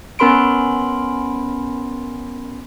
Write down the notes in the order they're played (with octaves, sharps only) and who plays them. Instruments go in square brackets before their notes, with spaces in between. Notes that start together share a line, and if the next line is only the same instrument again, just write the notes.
[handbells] B3 C#4 A#4 B5 C6 D7